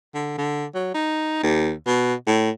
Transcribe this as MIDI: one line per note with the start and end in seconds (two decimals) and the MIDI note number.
0.14 0.38 50
0.38 0.65 50
0.75 0.91 54
0.94 1.42 63
1.43 1.72 39
1.87 2.14 47
2.27 2.50 45